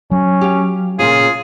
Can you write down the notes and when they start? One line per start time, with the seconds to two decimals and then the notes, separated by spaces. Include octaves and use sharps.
0.11 F#3 C#4
0.41 G4 F5
0.99 A#2 C#3 F4 G#4